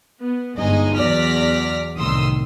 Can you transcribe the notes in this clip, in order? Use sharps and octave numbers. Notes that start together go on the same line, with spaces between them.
B3
G1 G#3 D#4 D#5 G#5
E2 F#3 D5 F6 A#6 B6
C2 A2 D#3 C6 D#6 E6